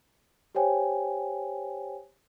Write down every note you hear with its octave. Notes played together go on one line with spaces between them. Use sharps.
G4 C5 C#5 G5 G#5